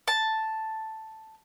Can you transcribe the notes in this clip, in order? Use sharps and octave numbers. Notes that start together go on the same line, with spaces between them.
A5